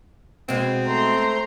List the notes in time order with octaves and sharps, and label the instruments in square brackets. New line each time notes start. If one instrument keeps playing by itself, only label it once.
[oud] B2 G#3 [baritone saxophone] C4
[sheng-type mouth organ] A3 C5 [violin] A#5 C6